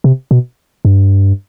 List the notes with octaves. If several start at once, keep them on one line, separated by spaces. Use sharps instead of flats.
C3
B2
G2